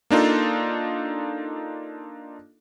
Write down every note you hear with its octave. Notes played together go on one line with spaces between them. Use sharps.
A#3 D4 D#4 F4 A4